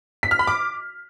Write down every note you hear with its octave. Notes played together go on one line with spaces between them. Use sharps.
B6
F6
B5
D6